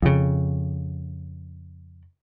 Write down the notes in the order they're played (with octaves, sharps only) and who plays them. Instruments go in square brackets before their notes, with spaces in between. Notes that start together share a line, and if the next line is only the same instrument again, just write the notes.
[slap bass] F2 C#3